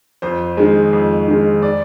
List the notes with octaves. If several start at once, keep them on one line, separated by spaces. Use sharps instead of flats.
F2 C5
D#3 G#3
F2
D#3 G#3
D5